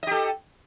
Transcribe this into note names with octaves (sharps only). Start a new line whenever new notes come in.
G4 A4 D#5